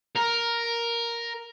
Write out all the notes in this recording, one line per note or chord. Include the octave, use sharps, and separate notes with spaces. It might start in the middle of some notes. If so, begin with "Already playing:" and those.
A#4